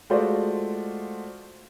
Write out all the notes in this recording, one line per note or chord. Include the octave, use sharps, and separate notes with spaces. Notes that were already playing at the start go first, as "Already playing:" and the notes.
G#3 A3 F4 F#4 C5 D5